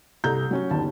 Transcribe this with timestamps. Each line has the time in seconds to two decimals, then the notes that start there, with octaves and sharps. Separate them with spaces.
0.24 C2 A4 A#5 G6
0.51 F#3 C#4 F#4
0.71 G1 D#2 A5